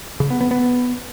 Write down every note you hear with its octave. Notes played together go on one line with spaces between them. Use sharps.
C#3
B3
B3
B3